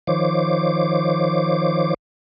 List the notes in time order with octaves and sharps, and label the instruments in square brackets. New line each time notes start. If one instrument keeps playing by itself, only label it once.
[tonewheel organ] D#3 F3 C5 C#5 D6